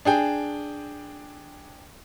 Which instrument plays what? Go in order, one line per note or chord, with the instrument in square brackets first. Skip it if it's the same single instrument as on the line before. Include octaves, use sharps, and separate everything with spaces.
[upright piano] D4 G#4 G5